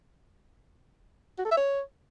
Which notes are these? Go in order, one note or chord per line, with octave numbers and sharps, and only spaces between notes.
F#4
A4
E5
C#5